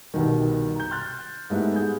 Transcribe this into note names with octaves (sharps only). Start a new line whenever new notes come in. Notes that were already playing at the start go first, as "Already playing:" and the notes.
C2 B2 D#3
A#5 G6
C6 F6 F#6 A6
G#2 G3 A3 B3 E4
G3 G#4 G6